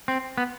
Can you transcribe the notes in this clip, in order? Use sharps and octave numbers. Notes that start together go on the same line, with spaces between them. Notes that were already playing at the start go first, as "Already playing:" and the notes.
C4
B3